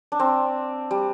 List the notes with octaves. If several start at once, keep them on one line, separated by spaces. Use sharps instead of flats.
D4
C4
G3